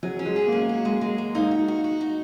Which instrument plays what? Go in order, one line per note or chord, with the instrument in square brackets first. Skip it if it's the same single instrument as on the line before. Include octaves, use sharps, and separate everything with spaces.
[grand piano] F#3 [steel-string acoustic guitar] G#4
[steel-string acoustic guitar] C#4
[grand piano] G#3
[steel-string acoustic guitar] G#4
[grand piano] A#3
[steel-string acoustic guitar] C#4
F#4
G#3
G#3
G#3
[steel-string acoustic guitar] A#3 [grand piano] D#4
[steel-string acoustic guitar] F#4
F#4
F#4
D#4